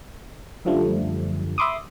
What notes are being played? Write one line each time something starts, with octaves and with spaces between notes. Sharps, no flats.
F#2 D3 F3 G3 A3
E5 B5 C6 D6 D#6